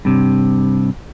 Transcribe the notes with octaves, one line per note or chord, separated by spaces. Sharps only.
G2 C3